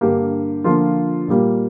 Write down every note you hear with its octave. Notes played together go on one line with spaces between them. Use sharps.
G2 D3 A#3 G4
D3 F3 A#3 F4
A#2 G3 A#3